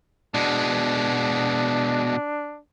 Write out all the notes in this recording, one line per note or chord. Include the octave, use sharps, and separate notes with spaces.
B2 G#3 D4